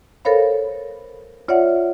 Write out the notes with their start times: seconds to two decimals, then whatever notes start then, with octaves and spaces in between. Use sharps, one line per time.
0.25 A4 A#4 C5 C#5 F5 B5
1.48 F4 C#5 D5 E5 F#5